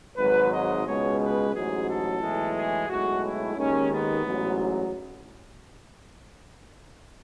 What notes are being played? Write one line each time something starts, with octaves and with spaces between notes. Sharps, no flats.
G#1 G#2 F#3 B4
D#5
C#2 B2 G#3 C#5
B4
A1 G#2 F#3 G#4
A4
B1 A2 E3 G#3
G#4
B1 A2 G#3 F#4
E4
D#2 D#3 G#3 C#4
B3
A1 G#2 F#3